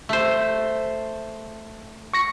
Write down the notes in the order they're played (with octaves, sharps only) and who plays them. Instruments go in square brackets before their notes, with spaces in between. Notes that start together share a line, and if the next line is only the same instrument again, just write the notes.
[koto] A3 C5
[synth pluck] C#6 A#6 C#7